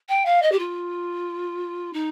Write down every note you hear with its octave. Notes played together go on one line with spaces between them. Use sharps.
G5
F5
D#5
G4
F4
D#4